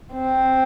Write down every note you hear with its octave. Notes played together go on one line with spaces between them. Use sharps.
C4